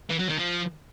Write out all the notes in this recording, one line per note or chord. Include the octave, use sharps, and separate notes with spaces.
E3
F#3
D#3
F3